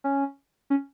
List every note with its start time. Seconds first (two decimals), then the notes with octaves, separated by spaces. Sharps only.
0.04 C#4
0.70 C#4